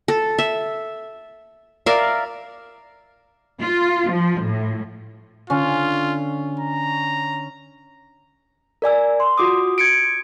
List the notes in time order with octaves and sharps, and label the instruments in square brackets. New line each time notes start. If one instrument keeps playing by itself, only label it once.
[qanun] A4
E5
A#4 D5 E5 F5
[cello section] F4
F3
A2
[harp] D3 [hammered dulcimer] C#4 [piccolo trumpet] F4
[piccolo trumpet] A#5
[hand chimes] A#4 D5 G#5 E6
C6
F4 F#4 D6 D#6
G#6 C#7 D7